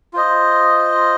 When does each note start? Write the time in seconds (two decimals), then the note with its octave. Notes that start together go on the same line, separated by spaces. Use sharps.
0.14 F4 C5 D#5